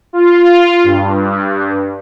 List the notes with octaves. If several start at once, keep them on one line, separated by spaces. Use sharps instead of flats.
F4
G2